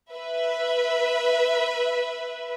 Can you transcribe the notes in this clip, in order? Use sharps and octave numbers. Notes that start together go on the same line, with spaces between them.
B4 E5